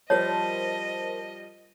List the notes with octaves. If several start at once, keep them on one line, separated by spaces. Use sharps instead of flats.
F3 G3 A#4 C5 C#5 D#5 A5